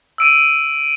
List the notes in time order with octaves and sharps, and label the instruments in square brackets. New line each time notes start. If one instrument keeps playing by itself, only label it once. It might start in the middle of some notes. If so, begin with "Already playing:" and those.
[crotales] E6 D7 D#7